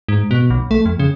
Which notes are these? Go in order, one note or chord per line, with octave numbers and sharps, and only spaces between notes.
G#2
B2
B1
A3
F2
C#3